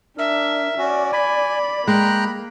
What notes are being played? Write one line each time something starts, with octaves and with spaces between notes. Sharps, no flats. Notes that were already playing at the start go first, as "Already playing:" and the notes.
D4 A#4 E5
C#4 F#4 D5
G#5 B5
G#3 A#3 G5 A#5 F#6